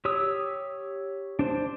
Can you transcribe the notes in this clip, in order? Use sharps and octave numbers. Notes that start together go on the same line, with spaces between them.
G4 C#5 D#6 E6
D4 C5